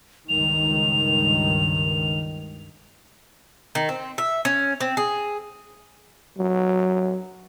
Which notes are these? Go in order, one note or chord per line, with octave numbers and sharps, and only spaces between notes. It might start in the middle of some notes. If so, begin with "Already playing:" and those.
C#2 G2 D#3 F7
D#3
C4
E5
C#4
C4
G#4
F#3